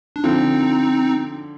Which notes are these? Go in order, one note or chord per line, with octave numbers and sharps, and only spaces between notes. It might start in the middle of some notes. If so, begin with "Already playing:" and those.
D4
D3 F3 C4 D#4